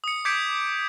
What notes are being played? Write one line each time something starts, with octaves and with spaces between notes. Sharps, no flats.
D#6 C#7
D6 G6 G#6 B6 C#7 D7